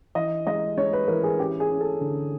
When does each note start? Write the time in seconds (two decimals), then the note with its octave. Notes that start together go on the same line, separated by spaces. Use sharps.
0.15 E3 D#5
0.47 G#3 D#5
0.78 G#3 C#5
0.93 B4
1.08 E3 A#4
1.24 G#4
1.39 C#4 G4
1.60 G#4
1.70 C#4
1.81 A4
2.01 D3